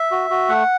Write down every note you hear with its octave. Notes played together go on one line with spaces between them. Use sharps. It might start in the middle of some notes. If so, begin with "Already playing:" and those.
Already playing: E5
F#4
F#4
A3 F#5